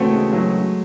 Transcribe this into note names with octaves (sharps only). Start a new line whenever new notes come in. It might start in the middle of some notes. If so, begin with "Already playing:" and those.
Already playing: D#2 C#3 E3 A3 C4 F#4
G#3
F#3